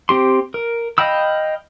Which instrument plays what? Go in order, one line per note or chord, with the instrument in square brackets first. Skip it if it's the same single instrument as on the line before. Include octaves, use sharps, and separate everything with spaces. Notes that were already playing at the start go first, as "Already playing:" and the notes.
[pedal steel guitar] C4 G4 C6
A#4
D#5 F5 G5 B5 E6